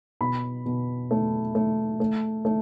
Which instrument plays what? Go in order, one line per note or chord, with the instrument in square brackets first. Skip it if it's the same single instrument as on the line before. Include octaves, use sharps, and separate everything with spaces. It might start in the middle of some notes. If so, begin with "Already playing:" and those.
[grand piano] B2 B5
B2
A3
A3
A3
A3